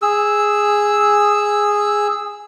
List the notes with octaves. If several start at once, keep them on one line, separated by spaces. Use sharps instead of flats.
G#4 E6